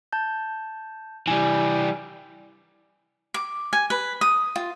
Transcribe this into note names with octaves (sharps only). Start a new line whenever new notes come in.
A5 G6
E3 G3 G#5
D6
G#5
B4
D#6
F4